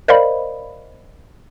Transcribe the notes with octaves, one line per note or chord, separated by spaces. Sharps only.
A#4 C5 D5 D#5 F5 B5